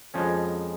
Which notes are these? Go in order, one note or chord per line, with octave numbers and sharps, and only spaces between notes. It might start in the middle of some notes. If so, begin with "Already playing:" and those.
F2 F3 G#3 C#4